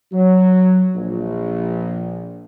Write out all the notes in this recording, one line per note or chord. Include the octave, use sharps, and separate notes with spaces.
F#3
A#1